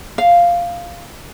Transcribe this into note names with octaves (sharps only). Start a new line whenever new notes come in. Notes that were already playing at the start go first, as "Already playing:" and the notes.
F5